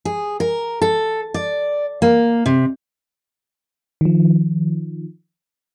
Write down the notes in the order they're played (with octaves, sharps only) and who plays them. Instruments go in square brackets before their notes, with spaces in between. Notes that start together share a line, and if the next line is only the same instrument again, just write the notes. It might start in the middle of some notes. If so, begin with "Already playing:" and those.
[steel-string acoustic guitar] G#4
A#4
A4
D5
A#3
C3
[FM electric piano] D#3 F3